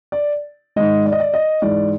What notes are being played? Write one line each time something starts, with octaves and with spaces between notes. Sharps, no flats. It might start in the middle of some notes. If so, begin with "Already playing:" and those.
D5
G#2 D#3 G#3 D#5
D5
D#5
D5
D#5
G#2 E3 G#3 D5